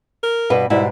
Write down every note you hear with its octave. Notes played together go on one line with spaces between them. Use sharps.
A#4
G2 B2 B4
G#2 B2 G3 E4